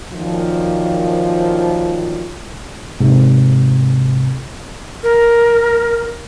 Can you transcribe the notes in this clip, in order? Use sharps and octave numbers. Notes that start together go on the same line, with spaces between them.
F#2 A#2 D#3 F3
G#2 C3
A#4